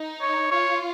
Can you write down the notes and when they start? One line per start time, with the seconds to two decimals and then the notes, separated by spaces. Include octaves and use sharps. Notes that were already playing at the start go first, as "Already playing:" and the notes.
Already playing: D#4
0.22 C#5
0.51 F4 C#5